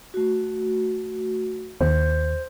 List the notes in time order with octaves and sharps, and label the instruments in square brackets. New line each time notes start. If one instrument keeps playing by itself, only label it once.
[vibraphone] A3 F#4
[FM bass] D#2 [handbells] C5